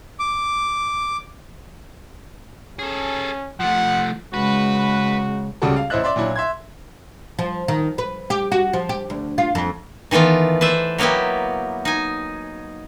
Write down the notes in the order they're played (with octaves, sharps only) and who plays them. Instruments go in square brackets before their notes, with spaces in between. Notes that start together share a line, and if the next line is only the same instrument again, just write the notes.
[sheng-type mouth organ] D6
[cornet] C#4 [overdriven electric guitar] G#4 A4
[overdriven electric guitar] F3 A3 [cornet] F#5
[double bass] C#3 G#3 [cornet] F#4 [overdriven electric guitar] B4
[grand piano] C#2 C#3 G3 F#4 A4
F5
A1 E4 C5 D#5 E5 F#6
D5 E5 C6
A#2 F#3 D4 E4
E5 C6 G#6
[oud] F3
D#3
B4
G4
F#4
F3
G4
D2
F4
F2
[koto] D#3 E3 A3 B3 F4
B4 C5 D5 E5
F#3 A#3 B3 E4 G4
D#4 G#5